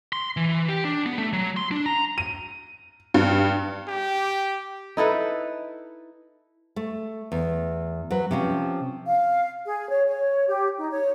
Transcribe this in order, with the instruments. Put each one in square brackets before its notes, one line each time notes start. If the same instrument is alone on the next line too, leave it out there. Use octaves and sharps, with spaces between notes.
[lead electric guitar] C6
E3
G4
D4
B3
A3
F#3
C6
D4
A#5
[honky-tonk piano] D#7
G2
[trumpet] G4
[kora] D#4 E4 A4 B4
[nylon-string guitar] A3
E2
F#3 B4
C3 F3 C#4
[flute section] F5
G#4
C#5
C#5
G4
D#4
C#5